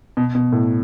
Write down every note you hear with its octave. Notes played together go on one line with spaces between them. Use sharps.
B2
B2
A2